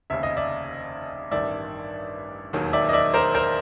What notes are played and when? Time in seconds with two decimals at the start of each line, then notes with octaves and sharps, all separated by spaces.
0.10 F1 D#2 C#3 E5
0.23 D#5
0.37 D5 E5
1.31 A1 G2 D#3 D5 E5
2.53 E1 D#2 D#3 F#3
2.73 D5 E5
2.89 D#5
2.93 D5 E5
3.14 A#4 C5
3.35 A#4 C5